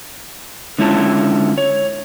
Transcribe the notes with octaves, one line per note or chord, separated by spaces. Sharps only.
D3 G#3 C#4 E4 F4 A5
C#5